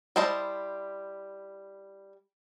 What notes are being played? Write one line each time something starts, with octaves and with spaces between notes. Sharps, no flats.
G3 E4 C5 D#5 A5